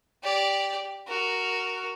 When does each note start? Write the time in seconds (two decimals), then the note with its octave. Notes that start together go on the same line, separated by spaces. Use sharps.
0.23 G4 D5
1.08 F#4 A#4